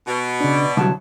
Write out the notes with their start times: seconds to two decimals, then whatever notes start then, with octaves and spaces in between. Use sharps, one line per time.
0.06 B2
0.41 C#3 D4 D5
0.77 C2 D3 F#3 A5